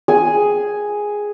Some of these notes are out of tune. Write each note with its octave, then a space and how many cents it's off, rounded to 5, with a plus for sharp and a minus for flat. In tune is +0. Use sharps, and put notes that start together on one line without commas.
G#4 +0 G#5 +0